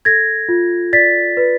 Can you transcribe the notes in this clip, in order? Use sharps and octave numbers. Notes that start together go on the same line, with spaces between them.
A4 G#6 A#6
F4
D5 A6 B6
B4